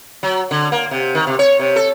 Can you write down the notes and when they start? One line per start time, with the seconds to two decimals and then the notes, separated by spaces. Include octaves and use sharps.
0.23 F#3
0.51 D3
0.72 A#3
0.91 C3
1.15 D#3
1.27 C3
1.39 C#5
1.59 C3
1.76 A4